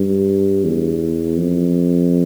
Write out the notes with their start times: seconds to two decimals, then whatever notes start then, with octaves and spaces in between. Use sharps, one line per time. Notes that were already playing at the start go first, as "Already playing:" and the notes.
Already playing: G2
0.64 E2
1.37 F2